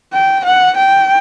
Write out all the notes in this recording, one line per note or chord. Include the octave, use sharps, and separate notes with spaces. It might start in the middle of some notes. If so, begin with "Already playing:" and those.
G5
F#5
G5